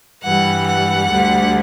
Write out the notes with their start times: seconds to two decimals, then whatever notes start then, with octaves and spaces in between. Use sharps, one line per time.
0.23 G2 E3 G3 F#5
0.66 F#5
1.11 D2 D3 G3